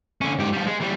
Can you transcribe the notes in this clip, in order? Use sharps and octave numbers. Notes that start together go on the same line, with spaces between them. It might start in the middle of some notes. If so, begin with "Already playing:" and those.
D3 C#4
G#2 G4
F3 G3
G#3
E3 G3